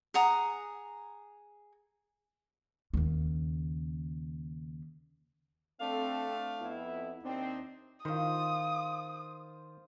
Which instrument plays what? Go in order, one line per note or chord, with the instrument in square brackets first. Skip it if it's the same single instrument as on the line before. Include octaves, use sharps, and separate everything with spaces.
[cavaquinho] G#4 F#5 A#5 D#6
[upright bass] D#2 C#3
[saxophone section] A3 D4 F5 [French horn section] C4 A4
[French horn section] F2 B3 E4
[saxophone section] D#2 D4 D#4 [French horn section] C4
[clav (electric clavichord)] D#3 [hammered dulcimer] F4 C5 [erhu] D#6